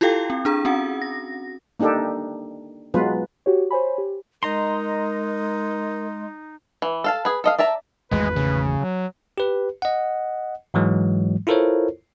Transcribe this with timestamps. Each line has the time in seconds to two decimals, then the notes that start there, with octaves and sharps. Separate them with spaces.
0.01 E4 F4 G4 A4 F5 G5
0.30 C4
0.45 D4 G#4 A#5
0.65 C4 C#4 F#4 F#5
1.02 A#6
1.80 A#3 D4 D#4 G4 A4
2.94 F#3 G#3 B3 F4 B4
3.46 F#4 G4 C#5
3.71 C5 C#5 G#5 B5
3.98 G4
4.43 G#3 D#4 A#4 D#5 A#5 C6
6.82 E3
7.04 A4 F5 A5
7.25 G#4 B4
7.44 A4 D#5 F5
7.59 D5 E5 A5 A#5
8.11 G#1 E2 G#3 A3 B4
8.36 C#3
8.79 F#3
9.38 G4 B4
9.82 D#5 F#5
10.74 G#2 E3 F#3 G#3
11.47 E4 F4 A4 A#4 C5 C#5